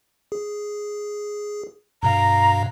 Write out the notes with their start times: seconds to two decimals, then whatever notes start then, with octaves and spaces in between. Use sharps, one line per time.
0.32 G#4
2.03 G2 B2 F5 A#5